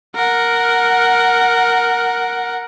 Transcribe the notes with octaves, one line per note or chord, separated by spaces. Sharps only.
A#4 F#5